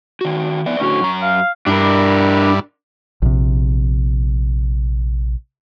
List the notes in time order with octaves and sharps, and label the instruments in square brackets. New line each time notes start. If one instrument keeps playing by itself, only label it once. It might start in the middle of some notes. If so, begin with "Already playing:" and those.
[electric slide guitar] D#3 F#4
B3 D5 E5
[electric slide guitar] A2 D3 F#4 [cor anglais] C#4
[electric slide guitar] F#2 A#5
[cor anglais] F5
[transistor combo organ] G2 G3 E4 [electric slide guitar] D4 A#4
[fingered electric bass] A#1 C3